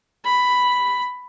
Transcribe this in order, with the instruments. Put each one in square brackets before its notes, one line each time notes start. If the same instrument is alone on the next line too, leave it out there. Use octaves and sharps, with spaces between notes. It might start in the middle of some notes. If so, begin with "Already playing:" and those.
[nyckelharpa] B5